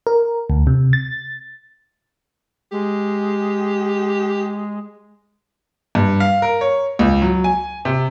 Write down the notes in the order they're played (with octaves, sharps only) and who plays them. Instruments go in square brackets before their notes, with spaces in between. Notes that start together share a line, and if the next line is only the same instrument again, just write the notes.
[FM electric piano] A#4
D2
C3
A6
[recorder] G#3 [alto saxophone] G4
[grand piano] G2
F5
A#4
C#5
C#2
F#3
G#5
C3